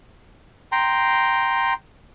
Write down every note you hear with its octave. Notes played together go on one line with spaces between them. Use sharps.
G5 A#5 C6